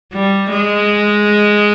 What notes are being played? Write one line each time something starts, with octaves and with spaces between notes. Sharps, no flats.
G3
G#3